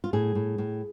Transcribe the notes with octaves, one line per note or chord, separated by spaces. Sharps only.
F4
A2 G#4
A2
A2